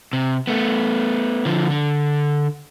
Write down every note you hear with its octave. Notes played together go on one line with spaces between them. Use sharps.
C3
A3 B3
D3 F3
D3